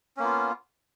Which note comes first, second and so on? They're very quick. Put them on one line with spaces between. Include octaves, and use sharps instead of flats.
C#4 A#3 B3 F4